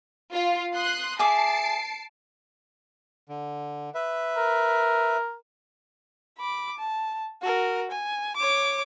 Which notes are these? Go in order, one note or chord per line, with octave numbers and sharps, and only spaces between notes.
F4
C6 D#6 F#6
G#4 E5 A5 D6 C7 D7
D3
B4 E5
A#4
B5 D6
A5
F#4 A#4
G#5
C#5 D6